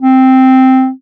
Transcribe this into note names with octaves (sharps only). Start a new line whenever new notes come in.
C4